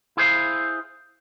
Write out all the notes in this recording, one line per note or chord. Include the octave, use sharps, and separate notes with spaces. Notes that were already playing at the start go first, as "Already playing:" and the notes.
E4 G#4 C5 F5